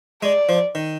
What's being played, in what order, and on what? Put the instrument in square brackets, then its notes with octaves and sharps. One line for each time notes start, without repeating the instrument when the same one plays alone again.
[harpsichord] G#3 [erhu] D5
[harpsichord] F3
D#3